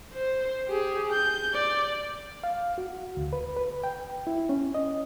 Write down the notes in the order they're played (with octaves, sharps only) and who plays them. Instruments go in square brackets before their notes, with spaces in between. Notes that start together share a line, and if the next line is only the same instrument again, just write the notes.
[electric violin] C5
G4 G#4
G6
D5
[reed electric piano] F5
F#4
D2
B4
B4
G5
E4
C#4
D#5